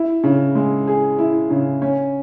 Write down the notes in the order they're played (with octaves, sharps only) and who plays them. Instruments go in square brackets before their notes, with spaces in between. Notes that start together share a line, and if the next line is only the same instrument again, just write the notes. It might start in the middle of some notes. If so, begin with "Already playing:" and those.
Already playing: [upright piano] E4
C#3
G#3
G#4
E4
C#3
C#4